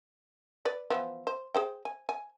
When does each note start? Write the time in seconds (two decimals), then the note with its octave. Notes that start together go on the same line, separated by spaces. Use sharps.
0.65 B4 D5
0.90 E3 F3 B3
1.27 C5
1.55 G#4 C5 G5
1.85 G#5
2.09 G#5